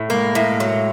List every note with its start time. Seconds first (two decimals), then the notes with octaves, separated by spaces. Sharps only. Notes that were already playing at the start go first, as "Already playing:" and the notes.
Already playing: A2
0.10 G#3 A#3
0.35 A2
0.60 F#3